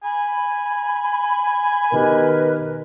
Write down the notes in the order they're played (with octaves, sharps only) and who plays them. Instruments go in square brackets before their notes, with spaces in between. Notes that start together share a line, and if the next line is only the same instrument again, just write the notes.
[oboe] G#5 [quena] B5
[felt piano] B2 D#3 G4 [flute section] A#4 B4 D#5